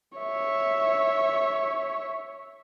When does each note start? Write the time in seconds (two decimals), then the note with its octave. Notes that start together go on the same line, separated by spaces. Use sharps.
0.19 C#5 E5